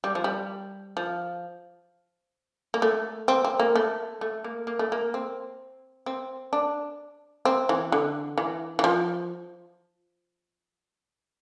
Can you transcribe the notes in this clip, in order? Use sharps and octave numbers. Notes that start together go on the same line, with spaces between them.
G3
F3
G3
F3
A#3
A3
C4
C4
A#3
A3
A3
A#3
A#3
A3
A#3
C4
C4
D4
C4
E3
D3
E3
E3
F3